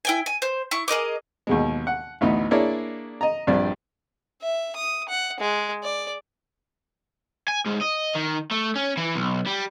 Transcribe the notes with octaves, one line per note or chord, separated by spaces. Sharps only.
E4 G5 G#5
G#5
C5
E4 C#6
G#4 A#4 D#5 D6
D#2 B2 G#3
F#5
A1 D2 B3 D#4
A#3 D4 E4 G#4 C#5 D5
D#5 A#5
A#1 G2 C4 D5
E5
D#6
F#5
G#3
D5
G#5
G#2
D#5
D#3
A3
C#4
E3
B1
G3